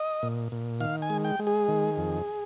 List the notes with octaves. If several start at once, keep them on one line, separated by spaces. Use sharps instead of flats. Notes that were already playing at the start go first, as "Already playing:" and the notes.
Already playing: D#5
A#2
A#2
D#3 F5
G#5
G#3
G5
G#3
G#4
D#3
F2